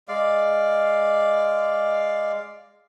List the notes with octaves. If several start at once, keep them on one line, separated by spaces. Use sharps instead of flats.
G#3 D5 F5